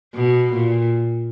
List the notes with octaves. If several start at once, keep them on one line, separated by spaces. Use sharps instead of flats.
B2
A#2